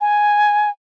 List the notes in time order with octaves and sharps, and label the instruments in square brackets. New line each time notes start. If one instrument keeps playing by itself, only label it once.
[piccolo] G#5